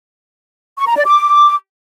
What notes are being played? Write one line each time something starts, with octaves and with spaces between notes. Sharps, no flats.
C#6
A#5
D5
D6